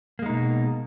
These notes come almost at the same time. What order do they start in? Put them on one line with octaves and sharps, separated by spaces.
A#3 G#3 D#4 B2